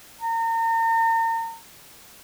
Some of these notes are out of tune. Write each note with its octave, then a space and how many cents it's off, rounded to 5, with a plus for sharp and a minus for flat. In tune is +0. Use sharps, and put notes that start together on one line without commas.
A#5 -40